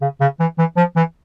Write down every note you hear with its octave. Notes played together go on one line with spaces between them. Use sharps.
C#3
C#3
E3
E3
F3
E3